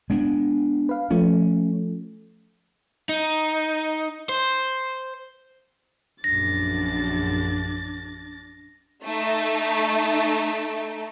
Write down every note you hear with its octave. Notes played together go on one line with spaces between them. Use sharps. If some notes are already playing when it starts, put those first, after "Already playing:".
G#3 B3 D4
B4 F5
F3 A3 C#4
D#4
C5
A#1 F#2 D4 A6 A#6
A3 D#4